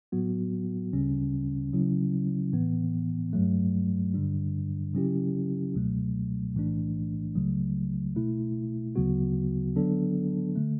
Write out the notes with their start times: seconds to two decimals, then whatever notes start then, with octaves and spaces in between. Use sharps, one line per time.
0.12 A2 F#3 B3 F#4
0.93 D2 C#3 G3 C#4
1.73 C#3 F#3 C#4 E4
2.53 A2 E3 B3
3.33 G2 F#3 A3
4.14 G2 D3 G3 D4
4.94 C#3 F#3 C#4 E4 G4
5.74 C#2 B2 F#3 A3
6.55 B1 A2 E3 A3 D4
7.35 C#2 C#3 F#3 A3
8.15 B2 A3 E4
8.95 D2 C#3 F#3 B3 F#4
9.76 D3 F#3 B3 D4 A4
10.56 D3 A3